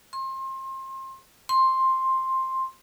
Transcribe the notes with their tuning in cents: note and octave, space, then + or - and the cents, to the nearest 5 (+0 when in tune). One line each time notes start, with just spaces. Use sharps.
C6 +30
C6 +10